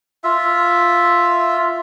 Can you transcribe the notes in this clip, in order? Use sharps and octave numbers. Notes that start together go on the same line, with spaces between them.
F4 E5